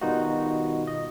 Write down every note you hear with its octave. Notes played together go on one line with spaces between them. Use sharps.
B2 D#3 G3 D#4 F4 F#4
D#5